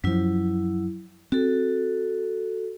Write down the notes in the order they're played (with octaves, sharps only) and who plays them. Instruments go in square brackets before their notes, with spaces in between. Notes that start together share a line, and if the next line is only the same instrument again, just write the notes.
[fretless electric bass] F#2 F3 [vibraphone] F#3 E4
[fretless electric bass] C4 [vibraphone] F#4 A4